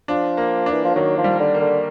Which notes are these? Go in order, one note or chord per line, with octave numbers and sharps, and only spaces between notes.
F3 D4
A#3
D4
E3
F3
D#3 F#3
F3
G3
D3
A#3
D3